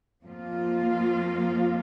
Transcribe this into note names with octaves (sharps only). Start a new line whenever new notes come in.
F2 F3 A#3 F4